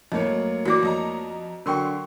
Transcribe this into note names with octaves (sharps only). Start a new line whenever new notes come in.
F2 A2 A3 A#3 C#5 D#5
F#2
A1 F#4 D5 D6 A#6
F2 D#5 A#5
D3 F#3 A#4 G5 C6 C#6